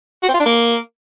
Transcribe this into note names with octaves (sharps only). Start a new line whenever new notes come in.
F#4
C4
F4
D4
A#3